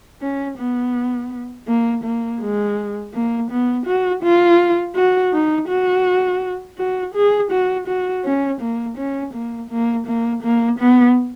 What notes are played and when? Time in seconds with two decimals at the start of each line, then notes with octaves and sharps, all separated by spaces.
0.21 C#4
0.58 B3
1.67 A#3
2.03 A#3
2.41 G#3
3.13 A#3
3.50 B3
3.86 F#4
4.23 F4
4.95 F#4
5.33 D#4
5.68 F#4
6.78 F#4
7.14 G#4
7.51 F#4
7.87 F#4
8.24 C#4
8.61 A#3
8.97 C#4
9.33 A#3
9.70 A#3
10.07 A#3
10.43 A#3
10.79 B3